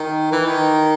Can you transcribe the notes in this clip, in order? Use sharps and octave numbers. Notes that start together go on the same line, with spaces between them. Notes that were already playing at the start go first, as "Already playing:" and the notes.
Already playing: D#3
E3
D#3